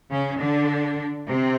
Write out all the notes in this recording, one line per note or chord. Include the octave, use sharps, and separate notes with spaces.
C#3 C#4
D3 D4
C3 C4